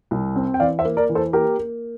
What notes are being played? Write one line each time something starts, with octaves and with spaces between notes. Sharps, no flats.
C2
C4
G5
E3 D5 F5
C5 E5
A#3
A#4 D5
E3
A4 C5
A#3 G4 A#4
A#3